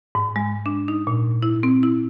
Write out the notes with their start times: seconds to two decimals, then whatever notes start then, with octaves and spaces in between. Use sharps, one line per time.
0.15 G#2
0.36 G#3
0.66 D4
0.88 D#4
1.07 A#2
1.43 E4
1.63 C4
1.83 E4